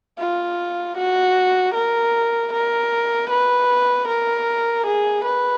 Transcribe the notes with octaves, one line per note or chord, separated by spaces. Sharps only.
F4
F#4
A#4
A#4
B4
A#4
G#4
B4